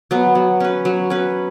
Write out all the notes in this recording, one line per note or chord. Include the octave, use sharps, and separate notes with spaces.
F#3 B3
F#3
C#4 B4
F#3
C#4 B4